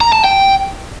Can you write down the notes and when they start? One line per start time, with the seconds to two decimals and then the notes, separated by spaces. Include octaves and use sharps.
0.01 A#5
0.13 A5
0.24 G5